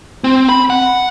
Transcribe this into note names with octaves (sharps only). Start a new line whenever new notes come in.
C4
B5
F#5